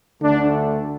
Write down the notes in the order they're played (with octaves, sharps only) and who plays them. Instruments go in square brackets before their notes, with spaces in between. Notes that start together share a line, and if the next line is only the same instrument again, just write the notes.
[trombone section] D2 D3 A3 D4